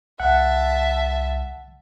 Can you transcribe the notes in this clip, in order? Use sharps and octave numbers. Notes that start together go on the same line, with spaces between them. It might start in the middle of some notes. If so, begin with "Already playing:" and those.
C2 E5 F#5 A5